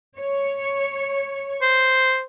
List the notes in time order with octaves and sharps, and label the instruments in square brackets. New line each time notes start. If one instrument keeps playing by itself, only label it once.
[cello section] C#5
[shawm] C5